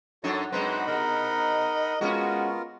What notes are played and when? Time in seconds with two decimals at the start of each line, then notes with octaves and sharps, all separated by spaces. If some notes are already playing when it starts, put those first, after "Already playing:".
0.24 F#2 D4 D#4 F#4 A4 C#5
0.52 F#2 G#3 C4 D#4 B4 C5 F#5 B5
0.87 B2 A#4 D#5
2.01 G#3 B3 C#4 F4 F#4 A#4